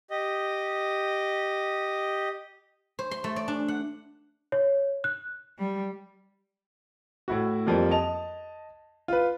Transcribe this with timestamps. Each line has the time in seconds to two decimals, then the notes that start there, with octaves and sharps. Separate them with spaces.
0.10 G4 D#5
2.99 C5
3.11 C6
3.24 A3
3.36 D5
3.48 D4
3.68 F#5
4.52 C#5
5.04 F#6
5.59 G3
7.28 A2 E4 F#4
7.67 F2 F3 G3 A#3
7.91 D#5 A5 F7
9.08 F4 B4